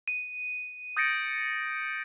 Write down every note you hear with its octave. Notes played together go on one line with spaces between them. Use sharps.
D#7
D#6 G6 A6 A#6 C#7 D7